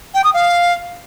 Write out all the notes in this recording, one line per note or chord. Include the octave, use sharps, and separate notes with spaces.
G5
D#6
F5